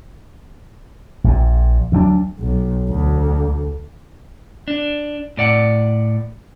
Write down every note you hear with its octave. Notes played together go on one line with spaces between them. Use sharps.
A#1 A#2
D2 F#3 A#3 D4
B1
D2
D4
A2 D5 F#5